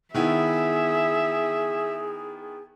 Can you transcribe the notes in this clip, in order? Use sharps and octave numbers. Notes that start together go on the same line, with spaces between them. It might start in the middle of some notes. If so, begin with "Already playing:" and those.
D#3 B3 E4 G#4 E5